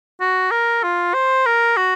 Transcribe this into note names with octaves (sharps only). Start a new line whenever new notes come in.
F#4
A#4
F4
C5
A#4
F#4